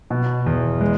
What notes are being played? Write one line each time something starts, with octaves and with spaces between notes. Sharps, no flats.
B2
E2
G#3